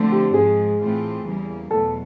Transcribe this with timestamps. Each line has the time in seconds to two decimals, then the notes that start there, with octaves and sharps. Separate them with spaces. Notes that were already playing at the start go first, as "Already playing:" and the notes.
Already playing: D3 F3 A3 C4
0.12 G4
0.34 G#2 F3 G#3 G#4
0.80 A2 E3 A3 C4 F4
1.26 E2 C#3 E3 G3 A#3
1.71 E2 B2 F#3 A3 A4